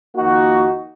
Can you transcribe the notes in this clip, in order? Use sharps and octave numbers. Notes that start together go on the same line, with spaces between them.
F2 D#3 A#3 D#4 F#4